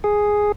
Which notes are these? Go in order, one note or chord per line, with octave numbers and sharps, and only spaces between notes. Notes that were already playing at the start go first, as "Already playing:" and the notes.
G#4